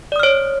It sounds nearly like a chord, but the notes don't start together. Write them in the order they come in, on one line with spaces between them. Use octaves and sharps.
D5 D#6 F6 C#5